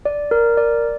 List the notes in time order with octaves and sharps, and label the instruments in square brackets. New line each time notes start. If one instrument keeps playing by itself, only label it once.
[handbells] D5
A#4
D5